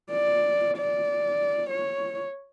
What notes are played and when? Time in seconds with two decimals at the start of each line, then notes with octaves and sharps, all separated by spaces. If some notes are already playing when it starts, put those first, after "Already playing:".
0.11 D5
0.77 D5
1.70 C#5